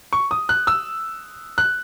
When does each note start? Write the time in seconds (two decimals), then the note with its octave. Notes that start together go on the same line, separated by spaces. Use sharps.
0.13 C#6
0.31 D#6
0.49 F#6
0.67 E6
1.58 F#6